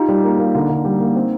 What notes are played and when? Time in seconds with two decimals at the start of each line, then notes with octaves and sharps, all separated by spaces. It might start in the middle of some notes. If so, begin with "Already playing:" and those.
Already playing: D#4 F4 G4
0.09 G3
0.23 A#3
0.39 A#3
0.55 D3
0.70 D3
0.85 G3
1.00 A#3
1.15 C4